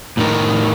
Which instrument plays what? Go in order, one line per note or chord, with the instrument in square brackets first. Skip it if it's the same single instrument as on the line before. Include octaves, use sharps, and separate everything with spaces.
[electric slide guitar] A2 A3 D#4 A#4